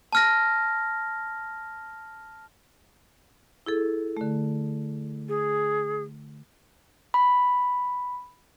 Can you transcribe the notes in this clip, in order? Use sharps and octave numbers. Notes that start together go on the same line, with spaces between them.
A5 F6 A#6
E4 G#4 A4
D3 A3
G#4
B5